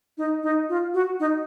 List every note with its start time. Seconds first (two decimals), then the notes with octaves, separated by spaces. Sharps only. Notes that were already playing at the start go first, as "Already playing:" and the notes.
0.18 D#4
0.43 D#4
0.69 F4
0.94 F#4
1.20 D#4